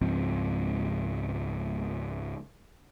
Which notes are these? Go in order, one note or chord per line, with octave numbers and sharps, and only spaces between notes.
C#2 G#2 F3 C4